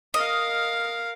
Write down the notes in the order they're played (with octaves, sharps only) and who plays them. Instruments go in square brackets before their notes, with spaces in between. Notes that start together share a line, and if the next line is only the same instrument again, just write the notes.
[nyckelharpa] A#4 F5 [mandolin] D#5